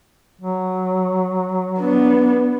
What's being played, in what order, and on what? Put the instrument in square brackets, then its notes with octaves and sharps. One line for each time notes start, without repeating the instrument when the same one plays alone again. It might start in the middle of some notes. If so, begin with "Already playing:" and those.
[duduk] F#3
[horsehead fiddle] B3 D4